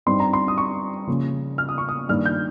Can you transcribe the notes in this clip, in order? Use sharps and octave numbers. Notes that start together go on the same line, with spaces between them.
G2 G3 C4 D#4 C6
A#5
C6
D#6
C#6
C#3 F3 A#3
F6
D#6
C#6
D#6
G2 D#3 A#3 D#4 F6
G6